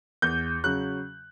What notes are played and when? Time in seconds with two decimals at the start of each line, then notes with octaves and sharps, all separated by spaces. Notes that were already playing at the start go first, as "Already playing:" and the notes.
0.22 E2 G6
0.64 C#3 F#3 F#6